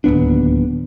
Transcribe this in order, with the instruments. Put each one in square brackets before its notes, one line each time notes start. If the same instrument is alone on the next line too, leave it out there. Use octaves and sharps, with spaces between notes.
[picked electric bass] D1 D#2 B3 D4